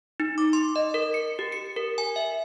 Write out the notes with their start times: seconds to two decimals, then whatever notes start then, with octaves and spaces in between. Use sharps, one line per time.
0.20 D#4
0.38 D6
0.53 C6
0.76 D#5
0.94 A#4
1.14 C#7
1.39 G4
1.52 C#7
1.76 A#4
1.98 G#5
2.16 E5